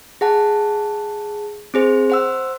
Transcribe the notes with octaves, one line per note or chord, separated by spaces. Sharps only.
G#4 F#5 A5
C4 G#4 C5
C5 F#5 E6